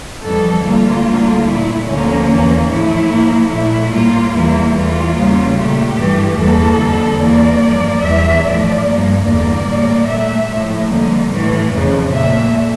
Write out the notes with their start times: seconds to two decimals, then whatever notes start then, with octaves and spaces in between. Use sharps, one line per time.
0.22 F2 E3 G3 A4
0.64 D2 D3 G3 A#3 F4
1.05 D2 D3 G3 A#3
1.45 A#2 A3 E4
1.86 D2 D3 F3 A#3 C#4
2.28 E2 E3 A#3
2.69 A2 F3 A3 E4
3.09 A2 F3 A#3
3.51 A#2 A3 E4
3.92 A2 G3 A#3 F4
4.33 E2 E3 G3 A#3 E4
4.74 E2 E3 A3 F4
5.15 E2 C#3 G3 A#3
5.56 A#2 A3 G4
5.97 G2 E3 A3
6.37 E2 E3 G3 A#3 A4
6.78 F2 D3 G3 A#3
7.19 E2 E3 A#3 D5
7.60 G2 F3 A#3
8.01 E2 E3 G3 E5
8.42 A2 F3 A3 D5
8.84 G2 F3 A#3
9.24 E2 D3 G3 A#3 D5
9.66 A2 G3 A#3
10.06 A#2 A3 E5
10.47 A2 F3 A3
10.88 F2 D3 G3 A#3
11.30 A2 E3 A3
11.71 F2 C#3 F3
12.11 A#2 A3 E5